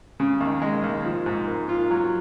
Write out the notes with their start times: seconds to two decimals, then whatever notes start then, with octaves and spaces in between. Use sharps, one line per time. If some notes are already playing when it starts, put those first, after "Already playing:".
0.20 C#3
0.40 D#2
0.62 G#3
0.83 D#2
1.05 F3
1.26 G#2
1.48 A#3
1.69 F4
1.91 F#3